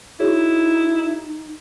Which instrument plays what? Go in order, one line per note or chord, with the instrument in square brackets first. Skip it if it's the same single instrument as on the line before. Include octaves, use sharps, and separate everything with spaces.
[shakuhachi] D#4 [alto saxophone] E4 [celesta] F#4 G#4 C#5